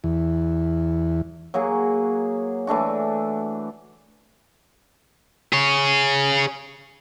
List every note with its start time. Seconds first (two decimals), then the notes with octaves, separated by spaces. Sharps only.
0.04 E2
1.54 F#3 A#3 F#4 G#4
2.67 E3 A3 D4 F#4
5.53 G#4 C#5